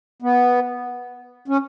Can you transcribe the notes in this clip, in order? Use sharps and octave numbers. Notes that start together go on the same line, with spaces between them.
B3
C#4